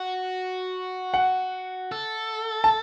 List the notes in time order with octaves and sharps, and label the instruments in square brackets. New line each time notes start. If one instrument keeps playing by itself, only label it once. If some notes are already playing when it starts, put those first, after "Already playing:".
Already playing: [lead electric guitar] F#4
[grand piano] F#5
[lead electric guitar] A4
[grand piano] A5